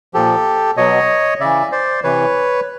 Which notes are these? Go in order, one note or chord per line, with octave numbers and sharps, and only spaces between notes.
A#2 F3 G4 A4
B2 F#3 C#5 D#5
C#3 E3 D5 E5
C5 D5
C3 E3 B4 C#5